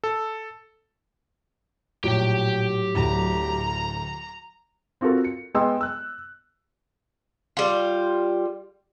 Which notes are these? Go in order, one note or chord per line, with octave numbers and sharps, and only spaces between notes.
A4
A#1 A2 F#3 G4 G5
D1 D2 A#5
C4 F4 F#4 A4 A#4
C#7
G#3 B3 D#5 G5 C6 E6
E6 F#6
G3 F4